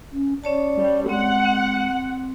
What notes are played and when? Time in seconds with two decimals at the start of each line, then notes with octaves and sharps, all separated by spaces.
0.13 C#4
0.44 C#4 C#5 D5 A5
0.77 G3
1.09 G#3 C4 F#5
1.45 C4